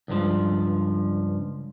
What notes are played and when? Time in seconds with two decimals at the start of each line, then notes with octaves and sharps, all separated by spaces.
0.08 C#2 G2 F3